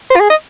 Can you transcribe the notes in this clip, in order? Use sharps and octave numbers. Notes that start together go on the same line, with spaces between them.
C5
F4
G#4
D#5